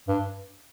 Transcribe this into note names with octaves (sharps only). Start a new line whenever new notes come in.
G2